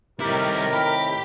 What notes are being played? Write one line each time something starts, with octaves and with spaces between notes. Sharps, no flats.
A2 C3 D#3 G3 E4 G4 A#4
G4 B5